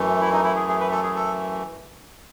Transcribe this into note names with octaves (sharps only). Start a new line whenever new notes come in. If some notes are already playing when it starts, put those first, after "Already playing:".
Already playing: F#2 E3 A3
E4
D#4
E4
G#4
G#4
B4
A4
G#4
A4